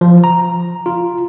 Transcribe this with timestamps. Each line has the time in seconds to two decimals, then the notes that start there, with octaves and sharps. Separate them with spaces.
0.01 F3
0.24 A#5
0.86 F4